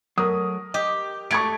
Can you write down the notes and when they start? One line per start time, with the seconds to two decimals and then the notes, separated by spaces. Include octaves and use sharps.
0.18 F#3 A3 A#4 D#6
0.74 G4 D#5
1.31 A3 C#6 G#6 D7